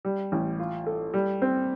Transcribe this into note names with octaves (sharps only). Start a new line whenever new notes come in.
G3
A1
F4
A4
G3
C4